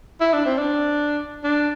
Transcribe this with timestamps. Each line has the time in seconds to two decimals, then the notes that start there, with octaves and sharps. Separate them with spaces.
0.21 E4
0.34 D4
0.46 C4
0.58 D4
1.44 D4